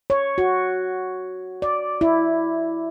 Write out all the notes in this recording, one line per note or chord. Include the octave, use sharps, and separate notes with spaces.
C#5
F#4
D5
E4